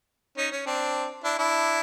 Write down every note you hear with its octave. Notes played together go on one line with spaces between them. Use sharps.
C#4 D#4
C#4
C4 D4
D4 E4
D4 E4